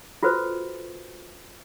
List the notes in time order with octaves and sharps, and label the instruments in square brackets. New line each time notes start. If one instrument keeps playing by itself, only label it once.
[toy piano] F4 F#4 A4 B4 C5